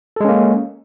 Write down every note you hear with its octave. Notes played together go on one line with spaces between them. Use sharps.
G#3 A#3 C#4 A4